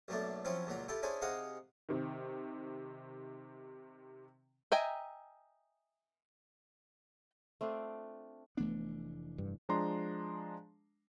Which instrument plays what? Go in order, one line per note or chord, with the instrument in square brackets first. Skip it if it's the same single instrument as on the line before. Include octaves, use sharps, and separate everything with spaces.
[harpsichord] B1 F#2 A3 A#3 D4
F3 F#3 C4 C#4 E4
C#2 A#2 F#3 A#5
E4 F4 G4 A4
C#4 D4 E4 G#4 C5
C3 D#4 G#4 F5 F#5 A#5
[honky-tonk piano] C3 D#3
[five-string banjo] D#5 E5 G5 G#5 A#5
[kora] A3 C4 D4 F4
[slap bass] F1 E3 D4 [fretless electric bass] A3 B3
[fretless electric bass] G2
[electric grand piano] F3 G#3 D4 A#5 C6